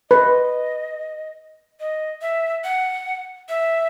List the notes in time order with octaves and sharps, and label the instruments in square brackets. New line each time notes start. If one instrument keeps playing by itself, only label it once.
[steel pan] B4 [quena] D#5
[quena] D#5
E5
F#5
E5